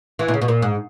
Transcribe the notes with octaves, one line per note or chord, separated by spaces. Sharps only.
E3
B2
C#3
B2
A#2
G#2